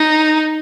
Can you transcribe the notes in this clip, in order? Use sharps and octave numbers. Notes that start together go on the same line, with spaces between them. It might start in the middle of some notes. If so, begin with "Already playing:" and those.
Already playing: D#4